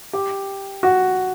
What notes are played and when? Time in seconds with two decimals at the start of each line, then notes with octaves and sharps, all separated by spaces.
0.13 G4
0.83 F#4